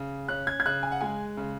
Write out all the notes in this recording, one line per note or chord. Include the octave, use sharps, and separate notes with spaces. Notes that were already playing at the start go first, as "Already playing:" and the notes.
Already playing: C#3
C#4 F#6
G#6
G#6
C#3 F#6
G#5
F#5
G#3 G#5
C#3